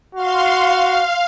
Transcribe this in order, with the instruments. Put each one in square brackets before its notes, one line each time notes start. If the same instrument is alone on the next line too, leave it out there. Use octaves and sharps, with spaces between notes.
[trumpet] F#4 [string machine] F5 C6
[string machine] F5